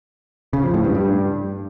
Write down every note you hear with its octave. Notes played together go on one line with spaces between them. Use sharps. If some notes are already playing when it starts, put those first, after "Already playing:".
C#3
F3
A2
G2
G2